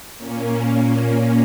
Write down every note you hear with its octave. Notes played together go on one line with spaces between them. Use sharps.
A#2 A#3 C#4